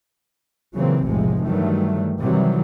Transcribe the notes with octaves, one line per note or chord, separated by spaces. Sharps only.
A#2 C#3 E3 F#3 A#3 C4
F1 B1 A2 C3 F3 G#3
G2 D#3 E3 F#3 G3 A3
C3 D#3 E3 F#3 G3